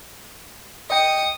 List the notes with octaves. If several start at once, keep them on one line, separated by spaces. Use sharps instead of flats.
D#5 G5 D#6 C#7